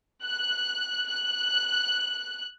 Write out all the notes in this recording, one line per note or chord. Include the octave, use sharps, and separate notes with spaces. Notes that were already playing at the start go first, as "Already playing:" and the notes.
F#6
F#6